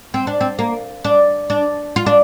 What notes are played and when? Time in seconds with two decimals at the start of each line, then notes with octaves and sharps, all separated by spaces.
0.14 C4
0.27 D4
0.41 C4
0.59 A#3
1.04 D4
1.50 D4
1.96 F4
2.06 D4